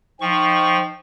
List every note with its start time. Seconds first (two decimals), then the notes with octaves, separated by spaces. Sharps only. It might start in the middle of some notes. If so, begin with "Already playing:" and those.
0.21 F3 D#4 G5 C#6